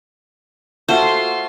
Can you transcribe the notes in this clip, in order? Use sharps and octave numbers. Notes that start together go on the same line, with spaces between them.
A3 F4 F#4 C5 C6